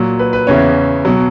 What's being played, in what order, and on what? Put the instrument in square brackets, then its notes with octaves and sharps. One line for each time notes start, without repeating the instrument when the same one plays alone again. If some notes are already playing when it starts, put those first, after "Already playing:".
Already playing: [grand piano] A#2 F#3
B4
B4
E2 C#3 E3 C#5
B2 F#3